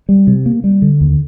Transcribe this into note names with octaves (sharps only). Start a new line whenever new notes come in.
G3
C3
A#3
G3
D3
D#2